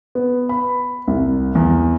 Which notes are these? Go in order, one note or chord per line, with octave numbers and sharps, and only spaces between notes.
B3
B5
C2
E2